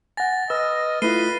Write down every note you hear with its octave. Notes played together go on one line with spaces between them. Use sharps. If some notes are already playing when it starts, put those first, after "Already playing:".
F#5 G#5 A6 A#6
B4 D#5 E6 F6
A3 E4 F4 B4 C7 D#7 G7